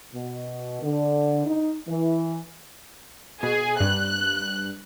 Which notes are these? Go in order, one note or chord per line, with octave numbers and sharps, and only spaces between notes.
B2
D3
D#4
E3
B2 G#4
G2 F#6